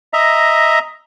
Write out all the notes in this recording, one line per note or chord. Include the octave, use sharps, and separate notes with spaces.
D#5 E5 A#5